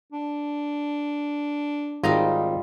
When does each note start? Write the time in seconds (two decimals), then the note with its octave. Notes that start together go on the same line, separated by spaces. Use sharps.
0.12 D4
2.04 G#1 G3 D#4 F4 D#5 A#5